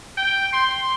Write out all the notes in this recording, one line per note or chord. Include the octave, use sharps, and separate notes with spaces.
G5
C6